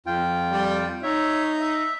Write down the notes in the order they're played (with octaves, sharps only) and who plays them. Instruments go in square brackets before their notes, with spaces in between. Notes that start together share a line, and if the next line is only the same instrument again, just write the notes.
[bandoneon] F2 F4 G5
[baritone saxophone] G3
[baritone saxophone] D#4 [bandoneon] C#5 E5
[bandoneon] E5